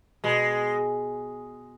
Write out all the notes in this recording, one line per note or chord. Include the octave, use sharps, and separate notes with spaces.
B2 G#3